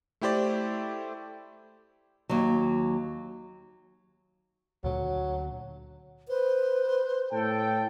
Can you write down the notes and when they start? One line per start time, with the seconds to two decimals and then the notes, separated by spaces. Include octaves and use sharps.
0.21 A3 E4 G4 C5 D5
2.29 D#2 F#3
4.84 D2 A#2 D3 F#3
6.29 B4 C5
7.32 A2 A4 G5